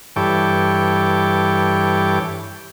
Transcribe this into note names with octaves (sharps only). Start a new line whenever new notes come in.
G2 E3 A4 C#5 G5 D6